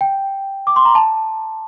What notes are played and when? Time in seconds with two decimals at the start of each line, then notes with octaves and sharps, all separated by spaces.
0.01 G5
0.67 D6
0.76 C6
0.85 A#5
0.95 A5